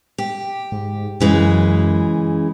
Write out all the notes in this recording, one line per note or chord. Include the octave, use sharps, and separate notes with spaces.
G4
G#2
F#2 C#3 E3 G#3